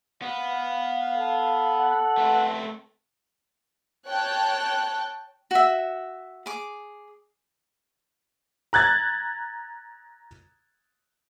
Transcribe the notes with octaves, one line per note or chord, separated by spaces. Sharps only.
B3 F5
A4
F#5
A3 C4 B4
C#5 G5 A5 F#6
F#4 E5
G#4 D6
A#5 F#6 G#6 A6